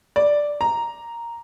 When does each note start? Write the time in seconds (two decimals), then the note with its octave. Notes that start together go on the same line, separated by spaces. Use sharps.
0.16 D5
0.61 A#5